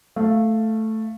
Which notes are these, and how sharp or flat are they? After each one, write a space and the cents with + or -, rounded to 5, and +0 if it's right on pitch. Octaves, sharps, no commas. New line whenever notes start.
A3 +0 F5 -15